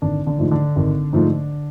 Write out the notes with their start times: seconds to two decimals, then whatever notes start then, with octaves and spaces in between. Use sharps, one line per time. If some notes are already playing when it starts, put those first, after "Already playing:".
0.02 G#1 D3 D4
0.26 D3 D4
0.39 G#2 F3 A3
0.51 D3 D4
0.76 G#1
1.13 G#2 F3 A3